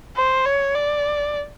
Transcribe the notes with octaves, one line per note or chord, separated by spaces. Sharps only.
C5
C#5
D5